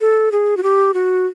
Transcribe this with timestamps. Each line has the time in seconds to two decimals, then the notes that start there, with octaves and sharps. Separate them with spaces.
0.01 A4
0.32 G#4
0.57 F#4
0.63 G4
0.94 F#4